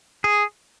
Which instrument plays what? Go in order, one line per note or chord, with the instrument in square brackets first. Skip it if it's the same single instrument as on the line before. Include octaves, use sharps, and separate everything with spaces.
[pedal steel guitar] G#4